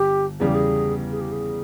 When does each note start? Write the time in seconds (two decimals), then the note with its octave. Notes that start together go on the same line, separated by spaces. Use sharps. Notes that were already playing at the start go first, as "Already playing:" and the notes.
Already playing: G1 G4
0.40 E2 C#3 G3 G#4
0.47 G4
0.54 G#4
1.11 G#4
1.21 G4
1.32 G#4